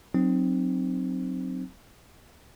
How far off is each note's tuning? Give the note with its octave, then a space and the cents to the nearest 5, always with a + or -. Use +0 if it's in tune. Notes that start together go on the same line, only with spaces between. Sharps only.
F#3 +0 C4 +0 D#4 -30